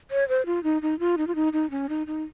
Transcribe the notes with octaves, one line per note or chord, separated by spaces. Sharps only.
C#5
C5
F4
D#4
D#4
F4
D#4
F4
D#4
D#4
C#4
D#4
D#4